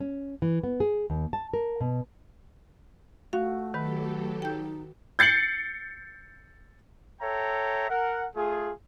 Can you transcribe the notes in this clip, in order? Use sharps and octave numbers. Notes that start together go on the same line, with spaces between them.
C#4
E3
B3
G#4
D#2
A5
A#4
B2
A3 F#4 F5
D#3 F#3 G4 A4 B4
D#4 G5 G6
G6 A6 C7 C#7 F#7
A4 C#5 E5 G5 A#5
A#4 F#5
A3 F4 G#4